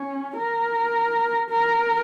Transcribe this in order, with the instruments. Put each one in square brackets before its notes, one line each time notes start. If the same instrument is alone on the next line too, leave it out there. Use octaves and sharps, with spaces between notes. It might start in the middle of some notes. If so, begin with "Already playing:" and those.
Already playing: [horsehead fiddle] C#4
A#4
A#4